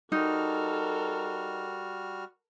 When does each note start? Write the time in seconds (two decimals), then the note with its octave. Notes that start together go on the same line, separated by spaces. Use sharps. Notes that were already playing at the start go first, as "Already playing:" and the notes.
0.12 G3 D#4 F#4 A4 A#4 F6